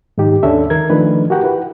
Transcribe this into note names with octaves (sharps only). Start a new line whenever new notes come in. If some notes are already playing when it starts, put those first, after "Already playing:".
G#2 D#3 D#4 G4
D#2 D3 C#4 D4 A4 E5
D#3 A#4 G#6
D#3 F3 A3 D4 B4
F#4 G4 A#4 F#5 G5
E4 B4